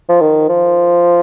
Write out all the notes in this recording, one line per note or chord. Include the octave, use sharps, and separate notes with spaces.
F3
D#3
F3